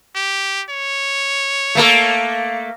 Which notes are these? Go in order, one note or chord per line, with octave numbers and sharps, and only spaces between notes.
G4
C#5
A3 A#3 A4